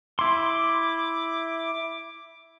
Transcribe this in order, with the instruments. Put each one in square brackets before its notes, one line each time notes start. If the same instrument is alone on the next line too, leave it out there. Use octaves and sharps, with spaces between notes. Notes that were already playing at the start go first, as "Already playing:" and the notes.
[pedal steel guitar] E4 C6 [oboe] D6